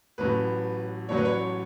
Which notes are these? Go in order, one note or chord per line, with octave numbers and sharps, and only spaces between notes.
A1 A2 F#3 B4
A1 A2 F#3 C#5
B4
C#5